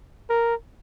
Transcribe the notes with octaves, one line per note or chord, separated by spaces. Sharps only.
A#4